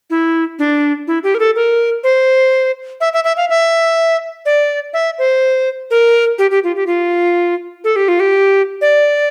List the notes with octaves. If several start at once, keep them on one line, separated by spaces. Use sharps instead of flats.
E4
D4
E4
G4
A#4
A4
A#4
C5
E5
E5
E5
F5
E5
D5
E5
C5
A#4
G4
G4
F4
G4
F4
A4
G4
F4
G4
D5